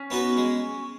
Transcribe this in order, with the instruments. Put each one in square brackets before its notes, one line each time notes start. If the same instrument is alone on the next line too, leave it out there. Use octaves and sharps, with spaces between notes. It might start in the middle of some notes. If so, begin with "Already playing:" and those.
Already playing: [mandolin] C#4
[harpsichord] B3 D#4 F#4 B4
G#3